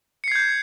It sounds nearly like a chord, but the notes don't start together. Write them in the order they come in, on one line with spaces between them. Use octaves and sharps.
C#7 C7 G#6 G6